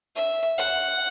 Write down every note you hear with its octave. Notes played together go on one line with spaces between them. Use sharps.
E5
F#5